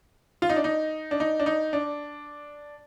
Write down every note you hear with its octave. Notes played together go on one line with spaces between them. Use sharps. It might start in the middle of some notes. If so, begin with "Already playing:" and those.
F4
D#4
D4
D#4
D4
D#4
D4
D#4
D4